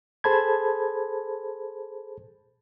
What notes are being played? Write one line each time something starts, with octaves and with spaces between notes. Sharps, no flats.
G#4 A4 C5 A5 B5 G#6